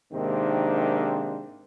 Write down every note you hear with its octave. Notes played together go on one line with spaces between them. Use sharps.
G#2 C3 D#3 A#3 C4 D4